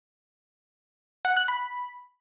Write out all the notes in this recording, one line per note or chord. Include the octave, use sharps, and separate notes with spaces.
F#5
F#6
B5